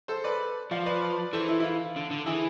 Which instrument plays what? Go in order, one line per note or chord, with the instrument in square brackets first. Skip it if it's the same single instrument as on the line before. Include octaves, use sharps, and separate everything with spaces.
[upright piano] A4 C5
B4 D5
[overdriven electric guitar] F3 [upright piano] D5 F5
[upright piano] B4 D5
[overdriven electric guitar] E3 [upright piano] A4 C5
[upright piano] E4
E4
F4
[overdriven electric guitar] D3
D3
[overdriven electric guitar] E3 [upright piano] E4 G#4